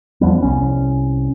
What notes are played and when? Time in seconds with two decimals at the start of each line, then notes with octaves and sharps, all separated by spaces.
0.21 E2 F3 G3 B3
0.42 C2 C#4